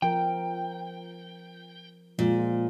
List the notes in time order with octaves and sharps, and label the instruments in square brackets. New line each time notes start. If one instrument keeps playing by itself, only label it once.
[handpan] F3 A#4 [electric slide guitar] G5
[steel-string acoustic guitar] A#2 [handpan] F3 G#3 F4